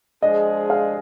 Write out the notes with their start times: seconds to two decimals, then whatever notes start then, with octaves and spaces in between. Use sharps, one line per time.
0.22 F3 G#3 D4 G#4 D#5
0.70 F5